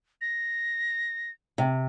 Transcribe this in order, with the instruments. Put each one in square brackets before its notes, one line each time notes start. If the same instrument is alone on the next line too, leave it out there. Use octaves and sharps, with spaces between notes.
[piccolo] A#6
[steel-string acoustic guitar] C3